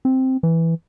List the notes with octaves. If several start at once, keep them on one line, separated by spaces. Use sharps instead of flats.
C4
E3